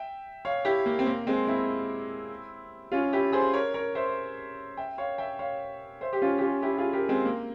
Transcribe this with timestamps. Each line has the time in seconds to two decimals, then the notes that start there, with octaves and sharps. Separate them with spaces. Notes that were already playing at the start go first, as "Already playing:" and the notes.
Already playing: E5 G5
0.45 C#5 F5
0.65 E4 G4
0.86 A#3
0.99 C4
1.06 A#3
1.27 G#3 C4
1.47 C4 E4
2.92 C#4 F4
3.13 E4 G4
3.32 G#4 C5
3.53 A#4 C#5
3.74 A#4 C#5
3.95 C5 E5
4.77 E5 G5
4.98 C#5 F5
5.18 E5 G5
5.39 C#5 F5
6.01 C5 E5
6.13 G4
6.22 C#4 F4
6.38 G4
6.42 C#4 F4
6.62 E4 G4
6.78 F4 G#4
6.93 G4 A#4
7.09 G#3 C4
7.25 A#3